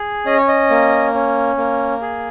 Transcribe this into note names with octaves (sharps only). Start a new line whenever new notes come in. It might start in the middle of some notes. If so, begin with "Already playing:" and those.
Already playing: G#4
C#4 D#5
C#5
D#5
A#3
C#4
A#3
G#4